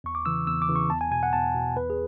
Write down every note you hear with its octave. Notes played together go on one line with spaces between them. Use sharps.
E2 C#6
D6
C#3 E3 E6
E2 E6
D6
C#3 E3
C#6
E2 A5
G#5
B2 G#5
F#5
E2 A5
B2
E2 B4
G#4